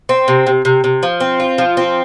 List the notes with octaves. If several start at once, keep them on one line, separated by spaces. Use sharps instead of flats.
C4
C3
C3
C3
C3
F3
C4
F4
F3
C4